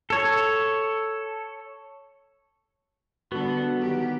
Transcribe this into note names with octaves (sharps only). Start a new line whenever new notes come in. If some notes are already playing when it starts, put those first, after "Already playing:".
A4 C#5
D3 G3 B3 F#4 A4
D#3 F#3 G4